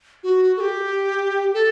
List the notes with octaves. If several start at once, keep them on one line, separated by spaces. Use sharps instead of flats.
F#4
A4
G4
A4